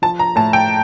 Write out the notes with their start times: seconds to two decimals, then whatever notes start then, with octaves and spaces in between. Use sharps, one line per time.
0.02 F3 A5
0.19 A#5
0.36 A2 A5
0.53 G5